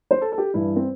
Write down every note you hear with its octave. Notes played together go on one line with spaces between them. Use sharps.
C5
A4
A4
G4
G2 E3 E4
C4